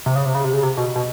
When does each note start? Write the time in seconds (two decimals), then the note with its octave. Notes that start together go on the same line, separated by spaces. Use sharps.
0.06 C3
0.16 C#3
0.25 C3
0.35 C#3
0.44 C3
0.53 C#3
0.63 C3
0.77 B2
0.96 B2